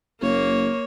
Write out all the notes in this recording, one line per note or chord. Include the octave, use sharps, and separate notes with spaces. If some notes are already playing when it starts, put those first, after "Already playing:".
F#1 A#3 C#5